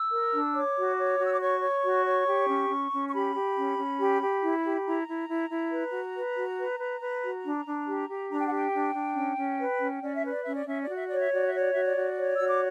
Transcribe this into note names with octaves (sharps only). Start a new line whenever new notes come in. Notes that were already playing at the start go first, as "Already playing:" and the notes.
Already playing: E6
A#4
D4
C#5 D6
F#4
C#5
F#4 E6
D6
C#5 C#6
C#5
F#4
C#5
G4
C#4
C#4
C#4
C#6
G4 B5
G4
C#4
C#4
G4
G4
E4
G4
E4 A#5
E4
E4
E4
B4
F#4
B4
F#4
B4
B4
B4
F#4
D4
D4
G4
G4
D4 A#5
G5
F#5
G4 G5
D4
D4
C#4
C#4
B4
C#4
C#4 D5
E5
B4 D5
C#4 E5
D5
C#4 E5
D5
F#4 E5
C#5 D5
E5
F#4 D5
E5
C#5
D5
F#4 E5
D5
F#4
C#5
F#4 E6
D6